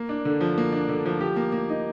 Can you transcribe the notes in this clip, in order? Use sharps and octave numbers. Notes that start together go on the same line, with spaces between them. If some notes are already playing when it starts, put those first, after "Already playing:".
Already playing: A#3
D4
D3
F3
A#3
D4
D3
F3
G4
A#3
A#3
D#4